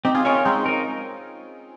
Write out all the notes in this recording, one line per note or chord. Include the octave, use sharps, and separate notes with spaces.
C4 D#4 G4
F4 G#4
C#4 D#4 F4 A#4 C#5
G#3 C4 D#4
D#4 A#4